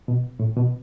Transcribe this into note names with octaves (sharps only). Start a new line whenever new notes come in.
B2
A2
B2